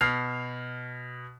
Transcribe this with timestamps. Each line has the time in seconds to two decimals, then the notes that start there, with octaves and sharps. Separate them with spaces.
0.01 B2 F6 C7